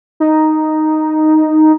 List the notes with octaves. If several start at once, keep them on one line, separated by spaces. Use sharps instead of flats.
D#4